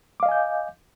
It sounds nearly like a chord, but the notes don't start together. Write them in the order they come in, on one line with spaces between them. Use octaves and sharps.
D6 F5 D#5 G#5 G6